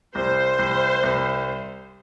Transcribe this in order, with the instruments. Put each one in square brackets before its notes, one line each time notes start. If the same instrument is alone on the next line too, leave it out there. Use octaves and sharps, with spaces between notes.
[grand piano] C2 [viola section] C5
[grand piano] C2
C2